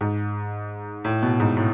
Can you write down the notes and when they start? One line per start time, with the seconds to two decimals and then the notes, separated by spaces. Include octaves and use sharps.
0.01 G#2
1.05 A2
1.22 B2
1.40 G#2
1.57 A2